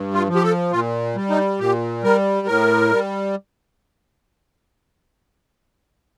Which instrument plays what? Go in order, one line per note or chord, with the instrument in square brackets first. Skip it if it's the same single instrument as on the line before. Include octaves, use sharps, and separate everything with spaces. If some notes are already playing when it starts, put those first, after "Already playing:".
Already playing: [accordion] G2
F4
F3
G4
A4
A#2 F4
G3
D#4
A#2 G4
G3 A#4
A2 A#4
G3